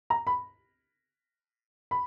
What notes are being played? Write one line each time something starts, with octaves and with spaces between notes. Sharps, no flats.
A#5
B5
B5